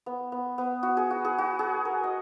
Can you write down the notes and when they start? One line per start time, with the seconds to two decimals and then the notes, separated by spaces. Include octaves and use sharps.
0.06 B3
0.32 B3
0.58 B3
0.83 F#4
0.97 G#4
1.10 F#4
1.25 G#4
1.38 F#4
1.59 G#4
1.85 A#4
2.04 D#5